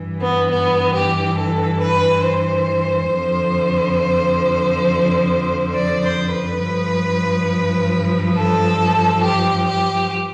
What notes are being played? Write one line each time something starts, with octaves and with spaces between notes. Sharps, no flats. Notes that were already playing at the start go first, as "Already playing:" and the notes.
Already playing: G2 E3
B3
B3
G4
A4
B4
C5
F2 D3 F3
D5
C5
B4
G2 F3
A4
G4
G4